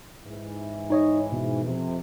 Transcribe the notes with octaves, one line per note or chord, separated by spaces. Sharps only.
G#2 E3
D#4 C#5 D#5
B2
F2 C3